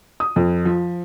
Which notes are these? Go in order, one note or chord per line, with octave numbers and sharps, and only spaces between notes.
D#6
F2
F3